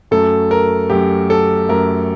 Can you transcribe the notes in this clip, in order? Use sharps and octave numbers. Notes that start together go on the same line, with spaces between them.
F#2 F#3 A3 A4
A#4
F#2 F#3 A3 G4
A4
F#2 F#3 A3 A#4